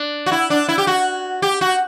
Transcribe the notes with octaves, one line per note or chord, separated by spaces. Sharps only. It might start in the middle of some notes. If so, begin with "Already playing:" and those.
Already playing: D4
F#4
E4
D4
E4
G4
F#4
G4
F#4